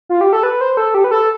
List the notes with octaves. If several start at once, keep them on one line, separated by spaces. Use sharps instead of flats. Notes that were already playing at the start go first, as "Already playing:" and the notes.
F4
G4
A4
B4
C5
A4
G4
B4
A4